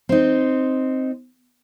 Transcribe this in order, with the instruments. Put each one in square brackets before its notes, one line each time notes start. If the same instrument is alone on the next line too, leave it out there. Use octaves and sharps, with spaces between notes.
[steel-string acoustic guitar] C4 D#4